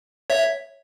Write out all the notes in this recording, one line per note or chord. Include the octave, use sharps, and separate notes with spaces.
C#5 E5